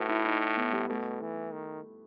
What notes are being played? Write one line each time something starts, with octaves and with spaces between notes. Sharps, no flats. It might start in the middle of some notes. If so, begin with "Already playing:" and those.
Already playing: A2 F#4 B4
E4
D#4
B3
G3
B2 A3
E3
D#3